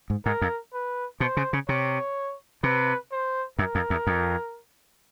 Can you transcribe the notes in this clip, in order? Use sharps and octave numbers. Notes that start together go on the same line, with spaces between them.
G#2
G#2 A#4
F2
B4
B2 C5
C#3
C#3
C3 C#5
C3 B4
C5
F#2 A#4
F2
E2
F2